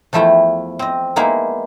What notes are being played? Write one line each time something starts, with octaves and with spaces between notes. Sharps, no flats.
E2 F3 A3 E4 G5
C4 D#5
G#3 A#3 B3 D#4 E4